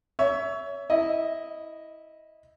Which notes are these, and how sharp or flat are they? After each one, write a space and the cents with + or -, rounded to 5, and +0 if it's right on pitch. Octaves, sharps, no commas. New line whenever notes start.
C#5 +25 E5 +0
E4 -15 D#5 +0